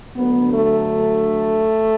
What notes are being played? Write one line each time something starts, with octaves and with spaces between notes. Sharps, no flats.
D2 D3 F#3 B3
A3